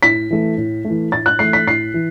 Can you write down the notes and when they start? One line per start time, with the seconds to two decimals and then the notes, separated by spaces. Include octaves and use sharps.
0.03 A2 B6
0.30 E3 A3
0.58 A2
0.85 A3
0.90 E3
1.12 A2 A6
1.26 F#6
1.39 E3 A3 C7
1.53 B6
1.67 A2 C7
1.94 E3